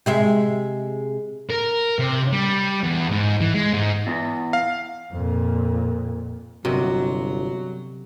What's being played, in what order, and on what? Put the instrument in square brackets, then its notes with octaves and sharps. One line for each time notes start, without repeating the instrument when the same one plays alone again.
[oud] C3 G#3 E5
[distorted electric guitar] A#4
C3
G3
E2
G#2
E3
G#3
G#2
[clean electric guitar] E2
[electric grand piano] F5
[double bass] F2 A#2
[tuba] G1 [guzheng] C3 [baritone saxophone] F#3 [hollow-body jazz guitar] F#4 A#4 D#5